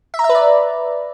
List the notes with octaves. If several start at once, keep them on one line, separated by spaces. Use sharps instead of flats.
E5
A#5
E5
B4
D5